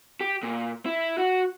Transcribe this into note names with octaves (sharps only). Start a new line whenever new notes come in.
G4
A#2
E4
F#4